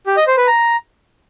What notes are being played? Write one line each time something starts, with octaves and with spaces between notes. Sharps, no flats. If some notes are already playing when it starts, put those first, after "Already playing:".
G4
D#5
C5
B4
A#5